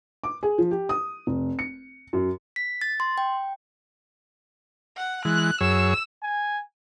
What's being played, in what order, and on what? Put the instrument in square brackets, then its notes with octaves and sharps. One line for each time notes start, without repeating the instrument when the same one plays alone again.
[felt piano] D6
G#4
F3
G4
D#6
F1
C#7
F#2
[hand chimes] B6
A6
C6
G5
[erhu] F#5
[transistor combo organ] E3 G#3 [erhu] F#6
[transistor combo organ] F#2 G#4 C#5 [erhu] E6
[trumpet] G#5